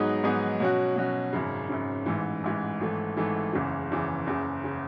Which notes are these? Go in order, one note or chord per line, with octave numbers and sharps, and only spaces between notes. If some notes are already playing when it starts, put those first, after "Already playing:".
Already playing: G#2 F#3 B3 D#4 G#4
G#2 F#3 B3 D#4 G#4
B2 F#3 C#4 F#4
B2 F#3 C#4 F#4
G#1 F#2 C#3
G#1 F#2 C#3
A1 G#2 E3
A1 G#2 E3
G#1 G#2 E3 A3
G#1 G#2 E3 A3
F#1 E2 C#3 E3
F#1 E2 C#3 E3
F#1 E2 C#3
C#3